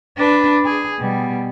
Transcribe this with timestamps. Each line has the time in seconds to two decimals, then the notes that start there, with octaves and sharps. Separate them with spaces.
0.17 D4 B4
0.65 G#4
0.99 B2 G3